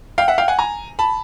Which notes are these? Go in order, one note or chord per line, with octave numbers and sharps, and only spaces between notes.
F5 G5
E5 F#5
F5 G5
F#5 G#5
G#5 A#5
A5 B5